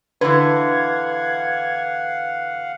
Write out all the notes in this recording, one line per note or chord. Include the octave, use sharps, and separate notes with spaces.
D3 E3 B4 F5 F#5 G#6